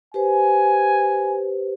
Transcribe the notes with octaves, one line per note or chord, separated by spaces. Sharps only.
G4 B4 C5 G#5